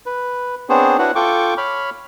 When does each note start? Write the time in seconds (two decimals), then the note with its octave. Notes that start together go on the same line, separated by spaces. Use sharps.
0.06 B4
0.69 B3 C4 D4 G#4 C5 C#5
0.99 D4 E4 F#4 B4 C#5 F#5
1.15 F4 A4 G5 C#6 D6
1.58 C#5 B5 F6